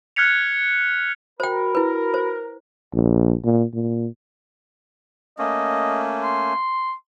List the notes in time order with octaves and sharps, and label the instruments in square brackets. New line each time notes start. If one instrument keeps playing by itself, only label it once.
[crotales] F6 F#6 G#6 B6 C#7 F7
[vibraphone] F#4 B5 [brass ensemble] A#4 [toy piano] C5 G5
[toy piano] E4 B4
C5
[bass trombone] A#1
A#2
A#2
[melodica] A3 A#3 C#4 [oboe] D#5
[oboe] C6